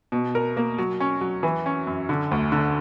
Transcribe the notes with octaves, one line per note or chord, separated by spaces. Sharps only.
B2
A#4
A#3
F#3
C#4
F#3
E3
C#4
F#2
D3
D2
D3